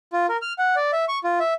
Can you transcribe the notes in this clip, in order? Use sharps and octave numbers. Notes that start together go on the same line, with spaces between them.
F4
A#4
F6
F#5
D5
E5
C#6
F4
E5